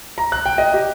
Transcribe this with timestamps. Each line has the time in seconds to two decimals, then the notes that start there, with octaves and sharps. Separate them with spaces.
0.18 A#5
0.32 F#6
0.46 G5
0.58 D#5
0.74 G4